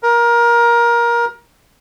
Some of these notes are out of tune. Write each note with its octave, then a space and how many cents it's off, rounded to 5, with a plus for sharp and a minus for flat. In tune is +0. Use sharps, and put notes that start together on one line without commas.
A#4 +20